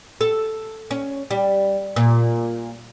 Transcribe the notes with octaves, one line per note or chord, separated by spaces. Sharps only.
A4
C#4
G3
A#2